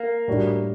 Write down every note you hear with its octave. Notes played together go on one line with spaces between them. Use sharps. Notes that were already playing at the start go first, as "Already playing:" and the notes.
Already playing: A#3
A2 G3 D4 F#4